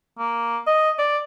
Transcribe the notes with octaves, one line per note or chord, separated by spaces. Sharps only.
A#3
D#5
D5